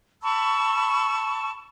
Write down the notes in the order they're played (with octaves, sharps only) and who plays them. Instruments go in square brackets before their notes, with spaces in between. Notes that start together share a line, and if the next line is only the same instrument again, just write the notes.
[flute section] A5 B5 C#6 E6